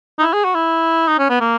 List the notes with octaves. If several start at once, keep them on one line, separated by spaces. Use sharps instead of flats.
D#4
E4
G#4
F#4
E4
D#4
C#4
B3
A#3